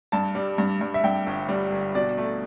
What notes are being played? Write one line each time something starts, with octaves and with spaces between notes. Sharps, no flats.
G2 A5
G3
G2
G2
E5
G2 G5
G1
G3
G1
B2 D5
A3